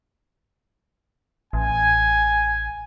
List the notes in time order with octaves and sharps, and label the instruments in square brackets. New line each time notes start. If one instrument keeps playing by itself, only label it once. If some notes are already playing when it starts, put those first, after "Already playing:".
[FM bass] A1 [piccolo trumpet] G#5